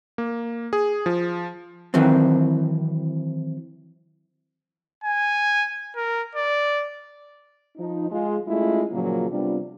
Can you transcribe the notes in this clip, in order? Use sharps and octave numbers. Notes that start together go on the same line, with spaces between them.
A#3
G#4
F3
D#3 E3 F#3 C4
G#5
A#4
D5
F3 D#4
G#3 F4
G#3 A3 C#4 E4 F4
A#2 C#3 F3 F#3 A#3
C3 G3 B3 D4 F4